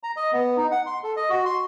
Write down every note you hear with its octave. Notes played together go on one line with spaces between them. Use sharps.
A#5
D#5
B3
D#4
F#5
C6
A4
D#5
F#4
C6